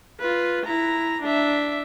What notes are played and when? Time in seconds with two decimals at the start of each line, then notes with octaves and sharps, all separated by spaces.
0.20 F4 B4
0.65 E4 A#5
1.22 D4 E5